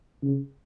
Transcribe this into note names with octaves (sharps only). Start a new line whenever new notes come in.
C#3